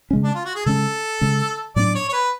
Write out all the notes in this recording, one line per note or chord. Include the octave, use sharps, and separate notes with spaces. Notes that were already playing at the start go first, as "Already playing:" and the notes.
C#3 G#3 C#4
D4
F4
F#4
G#4
C#3 G#3 C#4 A4
C#3 G#3 C#4
A2 F#3 B3 D4 D5
C#5
C#5
B4